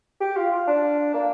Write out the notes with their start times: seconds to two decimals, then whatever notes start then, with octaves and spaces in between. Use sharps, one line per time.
0.21 G4
0.37 F4
0.52 F4
0.68 D4
1.14 A#3